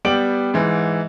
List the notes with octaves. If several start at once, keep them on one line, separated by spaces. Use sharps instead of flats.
G3 B3 D5 G5 D7 F#7
G#2 E3